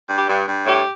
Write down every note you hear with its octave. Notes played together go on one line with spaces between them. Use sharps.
G2
G4
G2
G2
A2 G4